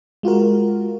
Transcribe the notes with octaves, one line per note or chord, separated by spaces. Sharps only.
G#3 F4 F#4 A#4